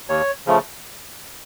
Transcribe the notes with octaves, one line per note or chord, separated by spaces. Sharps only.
D#2 C#5
C#3 F3 A3